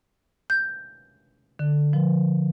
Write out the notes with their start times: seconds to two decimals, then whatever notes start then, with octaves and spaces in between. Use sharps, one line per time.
0.50 G6
1.59 D3
1.93 F3